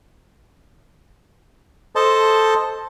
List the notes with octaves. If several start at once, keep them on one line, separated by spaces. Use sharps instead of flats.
A4 C5 D#5 A5